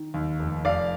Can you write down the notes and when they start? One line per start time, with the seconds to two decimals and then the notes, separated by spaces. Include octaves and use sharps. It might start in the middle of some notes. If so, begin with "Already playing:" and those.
Already playing: D#3
0.14 D#2
0.39 F1
0.64 F1 D5 F5